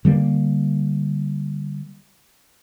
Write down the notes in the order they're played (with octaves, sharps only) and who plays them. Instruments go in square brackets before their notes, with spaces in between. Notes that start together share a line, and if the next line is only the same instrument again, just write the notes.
[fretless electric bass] D3 G3 A3 A#3